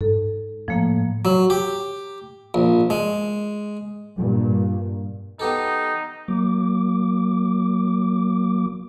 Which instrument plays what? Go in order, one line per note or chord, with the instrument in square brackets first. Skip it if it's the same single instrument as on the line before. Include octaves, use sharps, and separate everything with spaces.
[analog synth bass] G#2 [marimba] A4
[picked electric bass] A2 [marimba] F3 A#3
[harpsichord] F#3
G4
A#1
G#3
[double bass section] G2 A#2
[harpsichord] B3 G4 A4 [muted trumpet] D#4
[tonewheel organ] F#3 A#3 D6